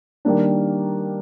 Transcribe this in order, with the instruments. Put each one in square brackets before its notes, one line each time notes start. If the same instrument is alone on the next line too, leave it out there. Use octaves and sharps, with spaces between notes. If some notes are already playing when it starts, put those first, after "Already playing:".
[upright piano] D#3 G3 A#3 D4